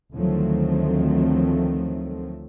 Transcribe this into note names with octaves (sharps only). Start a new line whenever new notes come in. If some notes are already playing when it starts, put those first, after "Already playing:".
D2 D#3 F3 F#3 A3 C4